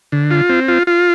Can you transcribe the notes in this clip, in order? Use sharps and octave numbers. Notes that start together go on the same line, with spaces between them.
D3
F4
C4
F4
F4